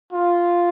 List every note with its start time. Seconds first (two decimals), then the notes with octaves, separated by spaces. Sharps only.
0.13 F4